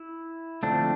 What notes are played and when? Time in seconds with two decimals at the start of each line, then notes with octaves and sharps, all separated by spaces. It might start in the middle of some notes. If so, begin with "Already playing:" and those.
Already playing: E4
0.63 D3 F3 A3 C4 D4